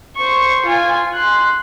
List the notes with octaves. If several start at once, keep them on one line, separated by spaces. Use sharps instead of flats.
C5 C#6
F4 G#5
C6 F#6